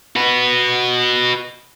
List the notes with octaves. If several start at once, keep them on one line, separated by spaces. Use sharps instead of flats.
F#4 B4